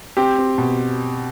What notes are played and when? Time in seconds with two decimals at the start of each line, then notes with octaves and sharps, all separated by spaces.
0.17 C4 G4
0.38 C4
0.58 B2